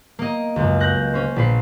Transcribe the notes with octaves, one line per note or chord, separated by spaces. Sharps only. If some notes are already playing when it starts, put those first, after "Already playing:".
A#3 D#5
C#2 F#2
F#6 G6 A#6
C#4 C5
A#1 B4 C7